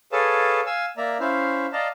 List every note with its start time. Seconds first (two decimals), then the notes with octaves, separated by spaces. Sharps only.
0.12 G#4 A4 B4 C#5 F5 A5
0.66 F5 G#5 E6
0.97 A#3 D5 E5 A#5
1.20 C#4 E4 C5 E5 F5
1.73 D5 D#5 F5 A5 A#5